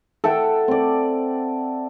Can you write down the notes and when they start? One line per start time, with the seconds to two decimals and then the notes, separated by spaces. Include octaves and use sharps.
0.24 A4 E5 F#5 G5
0.68 C4 D5